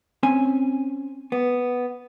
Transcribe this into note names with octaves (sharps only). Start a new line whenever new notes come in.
C4 C#4 G#5
B3